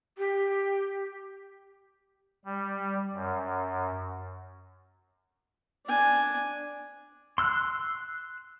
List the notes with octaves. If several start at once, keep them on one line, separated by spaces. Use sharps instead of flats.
G4
G3
F#2
D4 G#5
C6 E6 F#6